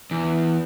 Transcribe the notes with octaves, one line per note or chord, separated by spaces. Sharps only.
E2